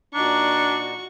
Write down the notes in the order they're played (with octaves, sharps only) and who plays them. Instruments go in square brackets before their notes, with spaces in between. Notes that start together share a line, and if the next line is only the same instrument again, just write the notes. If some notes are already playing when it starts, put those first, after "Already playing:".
[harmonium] A#2 D#4 A#5 [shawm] D4 [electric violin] F#4 C#6